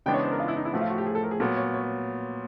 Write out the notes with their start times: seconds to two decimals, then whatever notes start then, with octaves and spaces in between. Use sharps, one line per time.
0.06 C#3 E3 G#3 B3 D4 G5
0.14 C#5
0.23 C5
0.31 A#4
0.39 F4
0.48 E4
0.57 D#4
0.65 E4
0.73 A2 F3 A3 F#4
0.81 F4
0.90 F#4
0.98 G4
1.06 G#4
1.15 A4
1.23 A#4
1.31 G#4
1.40 A#2 F#3 B3 A4
1.57 C#5
1.74 C#5